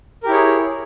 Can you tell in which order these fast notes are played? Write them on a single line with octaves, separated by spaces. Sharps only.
A#4 G4 E4 C#5 G#4